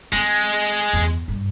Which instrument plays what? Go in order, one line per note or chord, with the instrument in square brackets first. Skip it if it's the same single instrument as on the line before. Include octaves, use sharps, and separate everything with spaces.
[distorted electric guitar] G#3 [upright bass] C4
[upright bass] E2
G2 C3